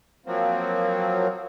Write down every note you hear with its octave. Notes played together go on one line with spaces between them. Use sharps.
F3 F#3 A#3 C4